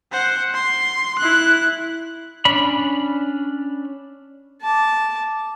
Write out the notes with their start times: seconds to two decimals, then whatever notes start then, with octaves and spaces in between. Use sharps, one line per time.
0.12 C5 F#5
0.54 C6
1.18 E4 F#6
2.45 C#4 D4 B5
4.62 A5 D6